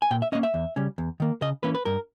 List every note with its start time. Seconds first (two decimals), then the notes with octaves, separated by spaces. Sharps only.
0.02 G#5
0.11 A#2 G5
0.22 E5
0.32 A#3 C#4 D#5
0.43 E5
0.54 E2
0.76 C#3 G3 C#4
0.98 E2
1.20 D#3 A#3
1.42 C#3 D#5
1.63 E3 A#3 C#4 B4
1.75 B4
1.85 G2 A#4